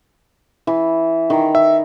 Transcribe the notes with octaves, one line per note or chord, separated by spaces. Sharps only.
E3
D#3
E5